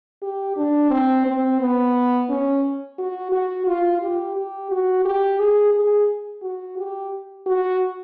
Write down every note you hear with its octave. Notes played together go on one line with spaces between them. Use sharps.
G4
D4
C4
C4
B3
C#4
F#4
F#4
F4
G4
G4
F#4
G4
G#4
G#4
F#4
G4
F#4